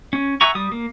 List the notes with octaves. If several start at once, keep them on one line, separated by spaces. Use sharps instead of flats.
C#4
E5 F#5 G#5 A#5 C#6
G3 D#6
A#3